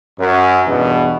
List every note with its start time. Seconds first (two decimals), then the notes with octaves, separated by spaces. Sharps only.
0.19 F#2
0.66 E2 G2 B2